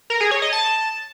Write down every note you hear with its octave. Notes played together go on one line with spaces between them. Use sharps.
A#4
G#4
C#5
D#5
A5